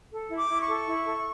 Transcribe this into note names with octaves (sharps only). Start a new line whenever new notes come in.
A4
E4
D6
E4
C#6
A4
E4
A4